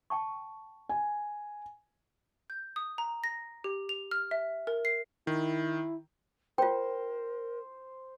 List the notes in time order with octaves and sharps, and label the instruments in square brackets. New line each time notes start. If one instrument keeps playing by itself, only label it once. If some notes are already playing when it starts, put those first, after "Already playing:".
[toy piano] G5 A5 C#6
[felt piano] G#5
[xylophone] G6
D#6
A#5
A#6
G4
F7
F6
E5
A#4
C7
[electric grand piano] D#3 [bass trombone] E4
[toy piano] F4 G5 [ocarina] A#4 [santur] C5